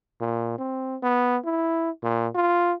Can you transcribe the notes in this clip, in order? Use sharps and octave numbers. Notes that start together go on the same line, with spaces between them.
A#2
C4
B3
E4
A#2
F4